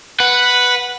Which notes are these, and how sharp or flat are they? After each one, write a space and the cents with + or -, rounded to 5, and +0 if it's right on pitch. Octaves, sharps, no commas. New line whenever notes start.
B4 +0 F#5 -5